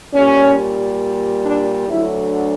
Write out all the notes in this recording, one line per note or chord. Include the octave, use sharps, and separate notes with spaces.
A#2 G3 C#4
D4
D2 D3 F#3 E4